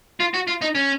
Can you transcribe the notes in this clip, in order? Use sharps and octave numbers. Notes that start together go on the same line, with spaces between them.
F4
F#4
F4
D#4
C#4